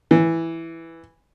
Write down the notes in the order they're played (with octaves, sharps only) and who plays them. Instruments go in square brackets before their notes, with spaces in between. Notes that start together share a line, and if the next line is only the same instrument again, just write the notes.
[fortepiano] E3